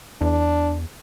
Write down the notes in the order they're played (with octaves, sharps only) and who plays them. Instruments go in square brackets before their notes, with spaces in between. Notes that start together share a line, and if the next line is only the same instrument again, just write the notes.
[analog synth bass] E2 [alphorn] D4